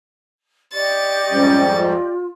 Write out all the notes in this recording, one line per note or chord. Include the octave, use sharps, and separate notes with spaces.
G4 D5 D#5 C#6 A6
F2 G#2 G3 C#4
F4